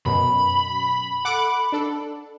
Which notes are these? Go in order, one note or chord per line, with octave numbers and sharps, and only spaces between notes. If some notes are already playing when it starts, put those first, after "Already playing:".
F#2 B2 B5
A4 F#5 D6
D4 A4